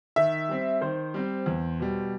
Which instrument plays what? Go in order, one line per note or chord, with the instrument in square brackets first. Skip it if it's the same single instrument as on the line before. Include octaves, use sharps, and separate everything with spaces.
[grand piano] D#3 [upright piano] E5
[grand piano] G3 C4
[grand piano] D#3 [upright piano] C5
[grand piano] G3 C4
E2
B2 G3